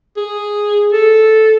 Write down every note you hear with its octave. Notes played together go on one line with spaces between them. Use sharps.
G#4
A4